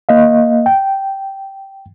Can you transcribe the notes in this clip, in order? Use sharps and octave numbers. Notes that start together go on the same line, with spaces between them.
A#3 D#5 F5
G5